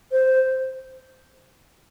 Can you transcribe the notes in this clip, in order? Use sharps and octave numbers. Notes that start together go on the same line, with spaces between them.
C5